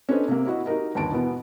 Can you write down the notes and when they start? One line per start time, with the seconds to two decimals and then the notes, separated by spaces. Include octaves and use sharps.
0.09 C#4 D4 A4 B4 C5 D#5
0.28 C3 A#3
0.47 E4 F#4 D#5
0.66 D#4 F#4 G4 A#4 D#5
0.95 G1 D#2 A5 D7
1.12 B2 E3 B3